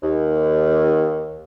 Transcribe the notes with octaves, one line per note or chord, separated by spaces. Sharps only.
D#2